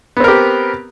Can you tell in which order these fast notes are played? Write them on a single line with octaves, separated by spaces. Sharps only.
B3 C4 A#4 G4